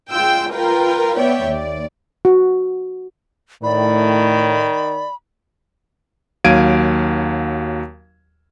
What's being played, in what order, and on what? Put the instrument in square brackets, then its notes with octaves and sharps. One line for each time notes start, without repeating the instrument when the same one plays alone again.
[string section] G#3 F4 G5 E6
F4 A#4 B4 G5
B3 C#5 D5 E5 G5
D#2 D5
[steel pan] F#4
[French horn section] A2 [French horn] D#3 [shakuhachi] D5 [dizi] B5
[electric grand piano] D#2 F#3 F5 G#6 D7 D#7